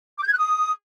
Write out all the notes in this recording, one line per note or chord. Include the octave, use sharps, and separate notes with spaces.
D6
G6
G#6
F#6
D#6